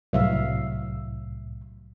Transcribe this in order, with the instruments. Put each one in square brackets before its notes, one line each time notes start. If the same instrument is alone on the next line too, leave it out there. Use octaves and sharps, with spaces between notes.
[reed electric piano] C2 A2 [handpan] F#3 E5 F5